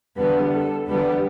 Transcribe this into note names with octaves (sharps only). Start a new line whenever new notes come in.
E2 D3 G3 B3 B4
A4
E2 D3 G3 B3 B4